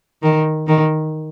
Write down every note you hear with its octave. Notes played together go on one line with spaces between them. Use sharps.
D#3
D#3